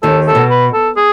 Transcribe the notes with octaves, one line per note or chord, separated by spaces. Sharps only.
D#2 D#3 A4
A4
B2
B4
A4
G#4